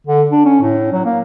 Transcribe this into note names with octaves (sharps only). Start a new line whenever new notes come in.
D3
D4
C#4
A2
F#3
A#3